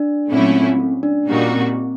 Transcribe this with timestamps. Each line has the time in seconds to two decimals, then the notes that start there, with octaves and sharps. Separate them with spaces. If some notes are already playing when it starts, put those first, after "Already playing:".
Already playing: D4
0.31 A#2 F#3 A3 C4 C#4 E4
0.55 C4
0.80 C#4
1.03 D4
1.27 A#2 G3 A#3 C#4 D#4 F#4
1.50 C4
1.75 C4